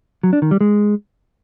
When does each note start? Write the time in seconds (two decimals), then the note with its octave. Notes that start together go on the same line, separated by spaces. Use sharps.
0.23 F#3
0.33 D4
0.42 D#3
0.51 G3
0.61 G#3